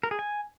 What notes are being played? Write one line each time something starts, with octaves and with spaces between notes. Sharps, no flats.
A#4
G#4
G#5